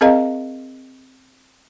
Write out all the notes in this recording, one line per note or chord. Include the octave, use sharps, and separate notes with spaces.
C4 G#4 A#4 D#5 F5 A#5